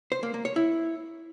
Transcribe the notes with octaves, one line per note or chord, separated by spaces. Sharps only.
C5
A#3
A#3
C#5
E4